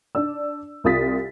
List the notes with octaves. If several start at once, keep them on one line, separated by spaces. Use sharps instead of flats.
D4 D5 E6
C2 F4 D#6 A6 B6